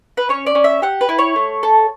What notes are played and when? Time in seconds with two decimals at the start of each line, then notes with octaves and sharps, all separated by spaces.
0.17 B4
0.29 C#4 C#5
0.46 D5
0.55 C#4
0.64 E5
0.82 G4 F#5
1.01 B4
1.09 E4
1.19 C#5
1.36 A3
1.63 A4